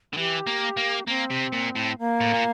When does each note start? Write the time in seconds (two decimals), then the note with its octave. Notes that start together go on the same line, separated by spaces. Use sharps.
0.13 D3
0.16 E3 G4
0.47 A#3
0.77 A#3
1.08 A#3 C4
1.31 C3
1.53 A#2
1.76 A2
1.99 A#3
2.20 A2
2.33 A#2